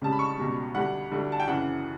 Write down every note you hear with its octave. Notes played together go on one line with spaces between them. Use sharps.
C#2 C#3 G3 A5
B5
C#6
C#2 B2 G3
D2 D3 G3 F#5
D2 D3 G3
A5
G5
F#2 C#3 E3 F#5